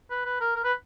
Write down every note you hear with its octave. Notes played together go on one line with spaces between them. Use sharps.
B4
B4
A#4
A#4
B4